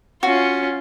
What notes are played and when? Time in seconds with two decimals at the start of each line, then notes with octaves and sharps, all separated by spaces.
0.23 C#4 F4 F#4